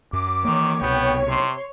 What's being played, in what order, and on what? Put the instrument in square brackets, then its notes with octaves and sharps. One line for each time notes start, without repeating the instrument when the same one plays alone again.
[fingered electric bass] F#2 [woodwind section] D6
[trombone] D#3 [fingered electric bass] E3 A#3 [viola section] C#5
[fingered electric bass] C2 B2 [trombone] B3 [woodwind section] G5
[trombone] C3 [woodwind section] C6